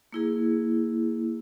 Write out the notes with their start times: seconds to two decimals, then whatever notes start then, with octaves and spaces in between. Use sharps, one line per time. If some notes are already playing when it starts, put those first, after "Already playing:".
0.13 A#3 E4 G#4